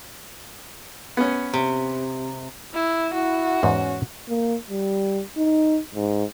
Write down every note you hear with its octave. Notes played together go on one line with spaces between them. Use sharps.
B3 C#4
C3
E4
E4 F#4
E2 G#2 C#4
A#3
G3
D#4
G#2